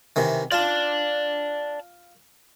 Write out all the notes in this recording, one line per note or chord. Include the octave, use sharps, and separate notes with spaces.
C3 D#3 E3
F4 D5 A5